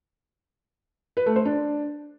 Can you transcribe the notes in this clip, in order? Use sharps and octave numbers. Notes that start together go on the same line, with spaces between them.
B4
A3
C5
D4